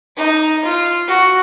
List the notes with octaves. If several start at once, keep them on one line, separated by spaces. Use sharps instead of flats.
D#4
F4
F#4